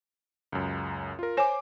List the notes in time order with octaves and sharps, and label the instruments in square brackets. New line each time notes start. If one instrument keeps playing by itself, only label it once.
[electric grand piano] C#2 F#2
F4 A#4
[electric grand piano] C5 D6 [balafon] C#5 G#5